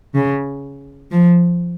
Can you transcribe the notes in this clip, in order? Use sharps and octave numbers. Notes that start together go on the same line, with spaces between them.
C#3
F3